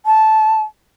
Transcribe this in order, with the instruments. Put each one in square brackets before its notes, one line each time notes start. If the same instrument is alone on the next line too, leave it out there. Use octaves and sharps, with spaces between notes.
[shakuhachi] A5